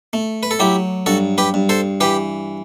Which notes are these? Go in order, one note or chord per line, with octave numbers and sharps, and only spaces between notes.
A3
B4
A4
F#3 E4 G4
G2 F#4 A4
G4 B4
G2
A4 C5
E3 G4 B4